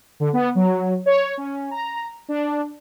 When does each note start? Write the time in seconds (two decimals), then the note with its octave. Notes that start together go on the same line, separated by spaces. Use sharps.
0.20 D3
0.33 B3
0.55 F#3
1.06 C#5
1.37 C#4
1.71 A#5
2.28 D4